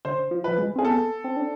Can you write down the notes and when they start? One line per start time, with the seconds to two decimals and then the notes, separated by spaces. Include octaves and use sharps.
0.05 D3 C5
0.31 F3
0.44 F3 B4
0.58 G#3
0.76 C4 G#4
0.85 B3 A4
1.24 C4
1.36 D4